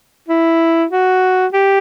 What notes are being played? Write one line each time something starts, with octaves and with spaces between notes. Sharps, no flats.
E4
F#4
G4